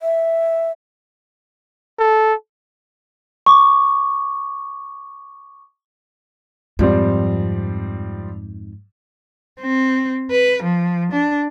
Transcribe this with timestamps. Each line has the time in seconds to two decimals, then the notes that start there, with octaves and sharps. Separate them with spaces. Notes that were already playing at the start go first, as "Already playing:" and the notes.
0.01 E5
1.99 A4
3.46 C#6 D6
6.79 F2 G#2 F3 G3 C4
9.60 C4
10.31 B4
10.63 F3
11.12 D4